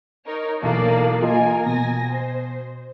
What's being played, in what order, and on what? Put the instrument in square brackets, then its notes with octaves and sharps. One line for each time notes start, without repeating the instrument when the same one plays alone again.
[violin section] D#4 A#4 C#5
[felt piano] B1 E3 [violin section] A#3 A4 D5
[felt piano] A#3 F4 D#5 [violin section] A#4 G#5
[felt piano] B2 [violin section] G#5 A#6
[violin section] C5